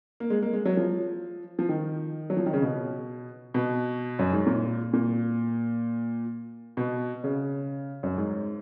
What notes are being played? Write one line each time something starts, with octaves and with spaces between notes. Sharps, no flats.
A#3
G#3
A#3
G#3
F#3
F3
F3
D#3
F#3
F3
D#3
C#3
B2
B2
F#2
G#2
A#2
A#2
B2
C#3
F#2
G#2